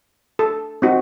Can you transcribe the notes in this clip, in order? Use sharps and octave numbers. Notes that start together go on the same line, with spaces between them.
A4
C4 D#4 F#4